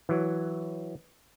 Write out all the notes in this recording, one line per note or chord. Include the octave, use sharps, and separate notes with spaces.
E3 F#3